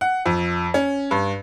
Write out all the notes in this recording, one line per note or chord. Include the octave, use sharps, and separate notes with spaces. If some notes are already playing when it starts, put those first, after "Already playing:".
F#5
F2
C#4
G2